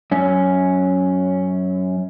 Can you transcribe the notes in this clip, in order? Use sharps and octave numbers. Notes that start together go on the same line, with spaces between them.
F#2 C#4